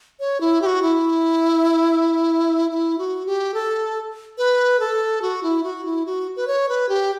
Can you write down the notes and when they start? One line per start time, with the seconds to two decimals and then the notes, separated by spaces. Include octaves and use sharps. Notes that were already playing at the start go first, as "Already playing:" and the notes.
0.20 C#5
0.41 E4
0.62 G4
0.66 F#4
0.82 E4
2.71 E4
2.98 F#4
3.26 G4
3.54 A4
4.38 B4
4.80 A4
5.22 F#4
5.43 E4
5.63 F#4
5.85 E4
6.06 F#4
6.36 B4
6.47 C#5
6.69 B4
6.89 G4